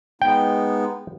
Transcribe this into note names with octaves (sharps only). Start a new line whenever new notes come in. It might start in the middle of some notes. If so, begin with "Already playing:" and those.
G#3 B3 D#4 G5